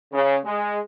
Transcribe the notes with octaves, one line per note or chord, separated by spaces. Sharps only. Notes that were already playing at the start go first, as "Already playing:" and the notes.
C#3
G#3